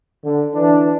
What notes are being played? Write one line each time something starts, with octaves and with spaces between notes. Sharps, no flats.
D3
E3 D4